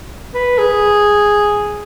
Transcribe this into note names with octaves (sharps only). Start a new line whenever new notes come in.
B4
G#4